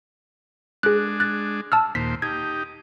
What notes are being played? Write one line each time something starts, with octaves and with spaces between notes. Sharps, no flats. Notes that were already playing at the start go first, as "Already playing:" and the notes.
G#3 D4 G#4 F#6
F#6 A6
A5 E6 F6
D#2 A#2 C5 B6
D#4 G4 G#6